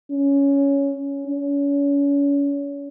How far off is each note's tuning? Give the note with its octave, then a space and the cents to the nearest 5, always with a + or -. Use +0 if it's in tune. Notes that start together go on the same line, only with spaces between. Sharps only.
C#4 +10
C#4 +35